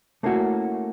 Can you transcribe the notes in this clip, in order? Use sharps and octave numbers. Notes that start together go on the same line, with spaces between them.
A3 A#3 C#4 E4 F#4